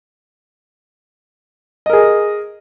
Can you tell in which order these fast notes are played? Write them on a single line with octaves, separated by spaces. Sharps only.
D#5 A#4 G#4